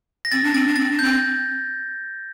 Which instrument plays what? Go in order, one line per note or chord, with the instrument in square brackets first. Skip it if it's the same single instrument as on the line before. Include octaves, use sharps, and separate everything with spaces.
[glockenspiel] A#6
[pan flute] C4 [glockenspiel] A6
[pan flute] D4
[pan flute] C4 [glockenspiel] A6
[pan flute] D4
[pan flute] C4 [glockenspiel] A6
[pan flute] D4
[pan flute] C4 [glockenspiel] G6